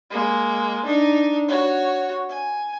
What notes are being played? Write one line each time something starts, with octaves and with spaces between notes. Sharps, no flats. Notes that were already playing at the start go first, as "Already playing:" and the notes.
G#3 A#3
D4 D#4
F#4 C#5
G#5